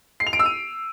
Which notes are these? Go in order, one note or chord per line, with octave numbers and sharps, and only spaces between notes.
C7
F7
D7
E6
D#7